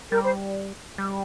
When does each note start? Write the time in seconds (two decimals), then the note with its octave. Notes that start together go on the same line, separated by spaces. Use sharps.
0.11 G3 A#4
0.22 C5
0.98 G3